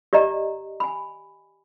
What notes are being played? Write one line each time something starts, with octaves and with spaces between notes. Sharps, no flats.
G4 D5 D#5 A#5
G#5 B5